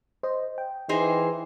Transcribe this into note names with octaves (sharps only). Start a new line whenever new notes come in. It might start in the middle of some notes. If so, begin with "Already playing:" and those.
C5 D#5
G5
E3 D#4 G#4 C5